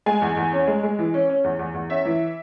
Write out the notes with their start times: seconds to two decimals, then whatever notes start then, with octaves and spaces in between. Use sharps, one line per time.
0.06 G#3 G#5
0.22 E2
0.37 E2
0.52 C#4
0.67 G#3
0.83 G#3
0.99 E3
1.14 C#4
1.30 C#4
1.44 E2
1.59 E2
1.74 E2
1.90 C#4 E5
2.05 E3